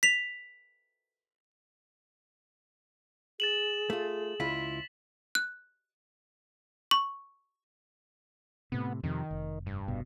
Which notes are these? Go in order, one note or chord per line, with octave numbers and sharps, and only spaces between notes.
B6 F7
G#4 A6 E7 F#7
A3 F4
C#2 E4 F4 B6
F#6
C#6
A2 C3 B3
F2 C3 D#3
F1
G2
F1 B2